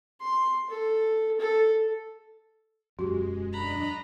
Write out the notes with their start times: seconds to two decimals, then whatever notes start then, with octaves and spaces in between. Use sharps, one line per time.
0.21 C6
0.70 A4
1.40 A4
2.99 E1 F#2 G#3 F#4 G4
3.53 D4 D#5 A#5 B5 F#6